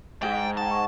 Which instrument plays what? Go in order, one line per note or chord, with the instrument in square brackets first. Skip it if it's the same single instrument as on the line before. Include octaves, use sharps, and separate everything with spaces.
[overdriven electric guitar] G#2 [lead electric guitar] G5
[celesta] F#5 G5 [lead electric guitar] A5
[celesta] F#5 C#6